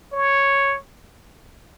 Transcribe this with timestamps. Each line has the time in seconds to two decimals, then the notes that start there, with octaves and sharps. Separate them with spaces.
0.13 C#5